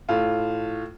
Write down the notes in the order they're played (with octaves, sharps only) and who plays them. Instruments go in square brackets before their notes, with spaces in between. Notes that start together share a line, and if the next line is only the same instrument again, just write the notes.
[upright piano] A2 F4